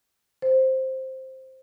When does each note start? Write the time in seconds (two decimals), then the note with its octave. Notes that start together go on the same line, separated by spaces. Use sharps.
0.42 C5